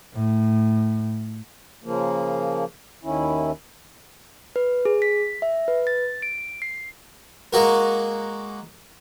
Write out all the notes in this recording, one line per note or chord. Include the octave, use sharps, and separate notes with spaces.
A2
C#3 F3 A#3
D#2 D#3 C#4 E4
B4
G#4
B6
E5
B4
A6
D7
C7
G#3 A#3 F#4 A#4